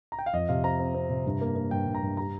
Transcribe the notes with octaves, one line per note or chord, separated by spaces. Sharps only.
A#5
G5
F5
F2 D#5
C3 F5
C4 A#5
C4
C4
C3
G2
A#3
A#3
G2 G5
G2
A#5
G2
G3 A#5